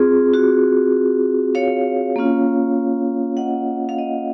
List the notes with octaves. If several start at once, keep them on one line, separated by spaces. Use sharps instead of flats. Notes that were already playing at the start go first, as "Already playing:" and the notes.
Already playing: C4 F4 G#4
F#4
C#5 F5
A#3 C#4 F4
D#5 F#5
F5
D#5 F#5